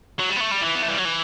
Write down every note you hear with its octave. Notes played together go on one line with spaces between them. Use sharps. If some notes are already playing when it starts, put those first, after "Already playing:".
F#3
G3
B3
A3
G3
E3
B3
A3
G3
F#3
E3